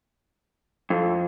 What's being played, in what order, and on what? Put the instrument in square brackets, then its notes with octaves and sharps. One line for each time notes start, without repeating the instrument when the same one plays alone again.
[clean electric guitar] F2